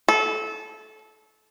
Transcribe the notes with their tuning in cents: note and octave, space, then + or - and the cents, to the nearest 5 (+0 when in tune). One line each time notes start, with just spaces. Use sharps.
A4 -25